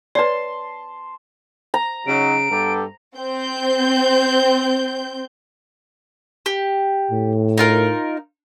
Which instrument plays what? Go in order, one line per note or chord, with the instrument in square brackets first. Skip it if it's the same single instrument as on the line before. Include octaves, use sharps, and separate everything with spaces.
[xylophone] B4 C#5 D5 [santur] A5 C6
[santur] A#5
[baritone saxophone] C#3 [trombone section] F#3 D#4 [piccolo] D7
[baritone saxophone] G2 [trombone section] B3 G4 A4
[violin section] C4 G6
[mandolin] G4
[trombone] A2
[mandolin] D#4 F4 A#4